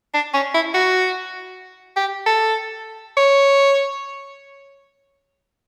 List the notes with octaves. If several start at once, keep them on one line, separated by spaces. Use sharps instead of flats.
D4
C#4
E4
F#4
G4
A4
C#5